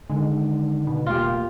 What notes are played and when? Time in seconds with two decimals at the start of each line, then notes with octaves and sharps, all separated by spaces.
0.10 D3 D#3 G#3
0.87 B2
1.06 E1 A3 A#3 F4 G4